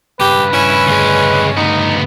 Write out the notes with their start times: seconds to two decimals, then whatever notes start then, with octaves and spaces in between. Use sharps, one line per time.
0.20 G2 C#3 G4 B4
0.54 C#4 E4
0.87 D2 G#3
1.57 D2 B3 D#4